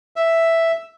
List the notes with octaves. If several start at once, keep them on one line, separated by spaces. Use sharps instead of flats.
E5